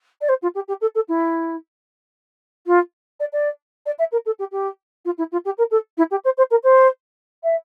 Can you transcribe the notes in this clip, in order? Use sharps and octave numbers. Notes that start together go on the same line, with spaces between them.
D5
C5
F4
G4
G4
A4
A4
E4
F4
D5
D5
D5
E5
A#4
A4
G4
G4
F4
E4
F4
G4
A#4
A4
E4
G4
C5
C5
A#4
C5
E5